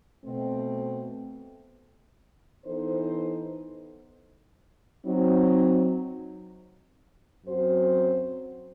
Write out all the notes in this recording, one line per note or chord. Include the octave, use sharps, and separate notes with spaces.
B2 A3 C4
E3 B3 D#4 A4 C5
F#3 C4 D#4
F#2 F#3 C4 F#4 C5